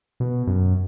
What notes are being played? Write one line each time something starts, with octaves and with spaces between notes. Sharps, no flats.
B2
F#2